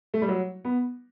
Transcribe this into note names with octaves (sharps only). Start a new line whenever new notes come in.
A3
G3
F#3
B3